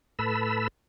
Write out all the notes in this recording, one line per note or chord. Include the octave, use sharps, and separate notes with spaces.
A2 A4 B4 B5 E6